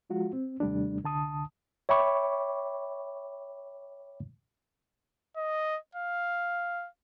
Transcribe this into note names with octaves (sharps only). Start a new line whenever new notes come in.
F3 G#3 F4 F#4
C4
D#2 C3 G3 A3 D4
C2 D3 A5 D#6
C#5 E5 G5 B5 C#6 D6
D#5
F5